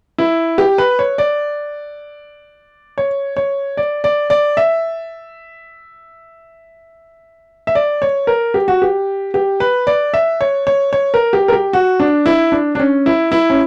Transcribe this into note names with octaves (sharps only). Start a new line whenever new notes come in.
E4
G4
B4
C#5
D5
C#5
C#5
D5
D5
D5
E5
E5
D5
C#5
A#4
G4
F#4
G4
G4
B4
D5
E5
C#5
C#5
C#5
A#4
G4
A#4
G4
F#4
D4
E4
D4
D4
C#4
E4
E4
C#4